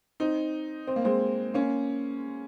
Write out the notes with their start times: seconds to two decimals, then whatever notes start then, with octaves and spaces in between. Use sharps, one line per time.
0.20 C4 D#4
0.87 C4
0.96 A#3
1.05 G#3 C4
1.54 A#3 C#4